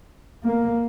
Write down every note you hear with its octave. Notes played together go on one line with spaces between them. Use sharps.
A#3